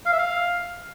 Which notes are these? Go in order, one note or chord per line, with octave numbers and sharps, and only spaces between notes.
F5
E5
F5